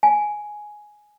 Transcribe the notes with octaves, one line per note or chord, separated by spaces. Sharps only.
G#5